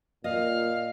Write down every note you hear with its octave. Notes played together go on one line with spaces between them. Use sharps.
A#2 D#5 F5